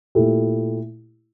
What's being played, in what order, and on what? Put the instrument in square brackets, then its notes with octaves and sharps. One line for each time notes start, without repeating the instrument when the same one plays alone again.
[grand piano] A#2 A3 E4 G4